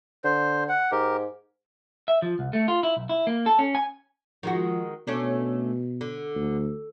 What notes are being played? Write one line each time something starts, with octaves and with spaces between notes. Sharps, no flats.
D3 C5
F#5
G#2 G4 A#4
E5
F3
C2
A3
F4
E4
B1
E4
A#3
A4
C#4
G#5
D#3 F3 G#3 F#4
B2 A3 C#4 D4
D3
D2